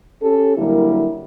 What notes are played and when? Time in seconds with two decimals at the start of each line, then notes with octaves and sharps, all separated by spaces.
0.22 C#4 G4 A4
0.57 D3 F#3 G3 A#3 E4 A#4